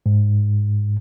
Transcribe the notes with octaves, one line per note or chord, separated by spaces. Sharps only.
G#2